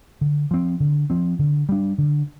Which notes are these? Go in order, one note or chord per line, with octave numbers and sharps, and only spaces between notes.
D3
F3 C4
D3
F3 C4
D3
G3 D4
D3